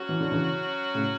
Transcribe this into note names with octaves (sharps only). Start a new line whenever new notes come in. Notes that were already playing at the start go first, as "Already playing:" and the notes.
Already playing: F#3 C#4 F#4
E3
D3
C#3 E3
A2 C#3